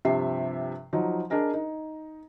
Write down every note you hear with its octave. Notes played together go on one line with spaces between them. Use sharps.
G2 C3 F3 G4 E5 C7
F3 F#3 D#4
D4 G#4 A#4 D#5
D#4